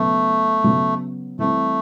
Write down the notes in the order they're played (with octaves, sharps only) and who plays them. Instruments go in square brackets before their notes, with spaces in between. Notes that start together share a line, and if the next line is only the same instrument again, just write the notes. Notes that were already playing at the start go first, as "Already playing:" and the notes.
Already playing: [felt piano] C#3 F#3 B3 [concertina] A3
[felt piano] C#3 F#3 B3
[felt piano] E3 G3 C4 [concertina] A3